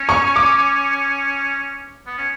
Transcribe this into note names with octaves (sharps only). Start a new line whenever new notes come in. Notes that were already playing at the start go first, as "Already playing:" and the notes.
Already playing: C#4
C#6
D6
B3
C#4